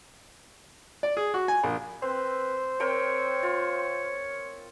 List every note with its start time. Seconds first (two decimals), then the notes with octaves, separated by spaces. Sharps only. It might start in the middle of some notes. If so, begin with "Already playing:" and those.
1.03 D5
1.17 G#4
1.34 F#4
1.48 G#5
1.64 A#1
2.02 C4 B4 C5
2.80 C4 A#4 C#5 G5
3.43 F4